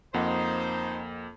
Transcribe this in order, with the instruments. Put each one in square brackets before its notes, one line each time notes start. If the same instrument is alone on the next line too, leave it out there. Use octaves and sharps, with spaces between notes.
[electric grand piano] F2 A#3 F#5 [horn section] D#4 C5